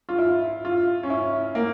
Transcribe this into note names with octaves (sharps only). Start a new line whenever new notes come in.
F4
E4
F4
C#4
E4
A#3